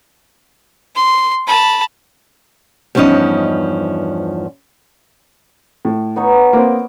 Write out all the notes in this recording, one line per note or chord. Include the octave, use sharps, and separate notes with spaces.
C6
A5 B5
E2 G2 F3 C#4 D#4 D#5
A2
B3 D#4 C#5
A#3 C4 D6